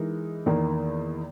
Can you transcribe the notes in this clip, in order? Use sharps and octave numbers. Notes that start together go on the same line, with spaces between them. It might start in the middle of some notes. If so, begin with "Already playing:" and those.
Already playing: E3 G#3 D#4 A#4
E2 D#3 A#3